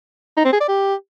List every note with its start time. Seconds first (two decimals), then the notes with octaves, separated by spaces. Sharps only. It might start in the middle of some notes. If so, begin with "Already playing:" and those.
0.37 D#4
0.45 C4
0.53 G#4
0.61 D5
0.68 G4